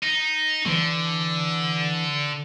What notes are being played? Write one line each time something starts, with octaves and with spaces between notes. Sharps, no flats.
D#4
D3 E3